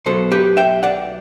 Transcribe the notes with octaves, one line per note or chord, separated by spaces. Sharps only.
B1 B2 F#3 A4 C5
G4 B4
E5 G5
D5 F#5